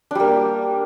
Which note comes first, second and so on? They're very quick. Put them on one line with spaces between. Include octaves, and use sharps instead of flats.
D4 G3 A#3